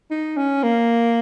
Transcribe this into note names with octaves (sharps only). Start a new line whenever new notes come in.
D#4
C#4
A#3